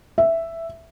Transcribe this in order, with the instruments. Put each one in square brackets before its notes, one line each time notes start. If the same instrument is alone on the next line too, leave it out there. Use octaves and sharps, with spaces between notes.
[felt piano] E5